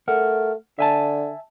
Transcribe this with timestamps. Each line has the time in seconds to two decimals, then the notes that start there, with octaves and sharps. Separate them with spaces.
0.08 A3 A#4 F#5
0.79 D3 E5 G#5 A5